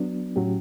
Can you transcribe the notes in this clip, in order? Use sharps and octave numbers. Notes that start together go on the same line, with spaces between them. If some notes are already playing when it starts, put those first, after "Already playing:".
Already playing: F#3 B3 D4
A2 F#3 C#4 G4